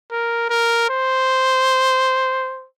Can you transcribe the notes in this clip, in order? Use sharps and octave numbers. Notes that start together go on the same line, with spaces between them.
A#4
A#4
C5